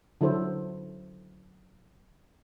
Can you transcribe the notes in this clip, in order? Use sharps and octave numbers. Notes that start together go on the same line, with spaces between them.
D3 F#3 E4 A4 C5